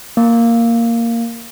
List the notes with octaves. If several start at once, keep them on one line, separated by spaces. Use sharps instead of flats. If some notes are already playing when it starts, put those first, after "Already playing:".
A#3